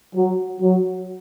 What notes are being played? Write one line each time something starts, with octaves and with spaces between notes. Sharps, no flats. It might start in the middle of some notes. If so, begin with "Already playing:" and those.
F#3
F#3